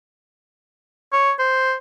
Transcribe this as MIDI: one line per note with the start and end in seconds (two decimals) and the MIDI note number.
1.12 1.32 73
1.39 1.74 72